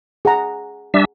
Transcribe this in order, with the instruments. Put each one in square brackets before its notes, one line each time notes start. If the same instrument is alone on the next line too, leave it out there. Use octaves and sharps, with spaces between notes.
[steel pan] G#4 F#5 A#5
[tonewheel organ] G3 D4 E5